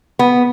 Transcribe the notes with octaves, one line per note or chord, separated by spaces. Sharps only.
B3